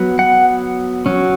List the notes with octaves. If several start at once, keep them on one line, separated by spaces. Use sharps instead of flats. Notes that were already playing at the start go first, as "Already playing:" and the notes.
Already playing: F#3 B3
F#5
F#3 C#4